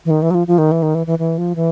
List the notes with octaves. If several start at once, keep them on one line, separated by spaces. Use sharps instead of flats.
E3
D#3
E3
F#3
F3
F3
D#3
E3
D#3
E3
E3
E3
F3
E3